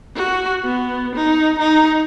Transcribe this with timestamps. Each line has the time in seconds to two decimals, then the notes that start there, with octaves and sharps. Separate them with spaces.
0.16 F#4
0.64 B3
1.15 D#4
1.59 D#4